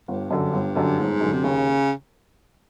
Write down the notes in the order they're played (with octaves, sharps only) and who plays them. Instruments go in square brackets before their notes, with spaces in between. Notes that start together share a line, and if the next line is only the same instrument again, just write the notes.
[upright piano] G1 [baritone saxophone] G2
[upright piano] F#2 D3
G1
F#2 D3
[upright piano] G1 [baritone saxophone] G#2
[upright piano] F#2 D3
[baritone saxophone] C3
[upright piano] D#2 [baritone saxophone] C#3